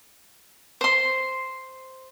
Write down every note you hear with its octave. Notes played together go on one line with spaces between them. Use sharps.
C5 C6